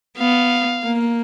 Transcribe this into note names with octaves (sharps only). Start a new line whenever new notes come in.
B3 F5
A#3